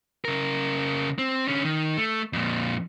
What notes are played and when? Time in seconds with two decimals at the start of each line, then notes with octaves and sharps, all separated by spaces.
0.25 C#3 A#4
1.18 C4
1.48 D3 C#4
1.65 D#3
1.97 A3
2.33 F2 A#2